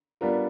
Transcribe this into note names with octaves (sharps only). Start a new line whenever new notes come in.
G3 B3 D4 F4 A#4